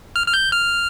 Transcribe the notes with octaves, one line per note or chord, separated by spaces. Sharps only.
F6
F6
G6
F6